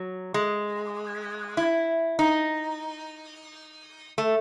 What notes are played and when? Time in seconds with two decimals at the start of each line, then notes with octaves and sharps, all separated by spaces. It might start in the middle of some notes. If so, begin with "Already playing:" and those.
Already playing: F#3
0.34 G#3
1.57 E4
2.19 D#4
4.18 A3